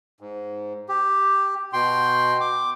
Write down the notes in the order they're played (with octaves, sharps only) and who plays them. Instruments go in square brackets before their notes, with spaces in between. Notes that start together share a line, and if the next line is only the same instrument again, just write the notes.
[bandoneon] G#2
G4
B2 G5 C6
D6